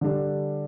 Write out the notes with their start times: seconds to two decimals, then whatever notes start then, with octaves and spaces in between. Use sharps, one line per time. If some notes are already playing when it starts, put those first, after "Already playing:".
0.01 D3 G3 D4